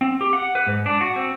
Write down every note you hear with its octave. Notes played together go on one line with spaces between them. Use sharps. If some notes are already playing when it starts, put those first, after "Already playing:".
C4
G4
F#5
B4
G#2
D4
F#4
C4